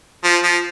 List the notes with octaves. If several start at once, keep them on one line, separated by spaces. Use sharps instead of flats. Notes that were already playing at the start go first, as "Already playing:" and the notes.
F3
F3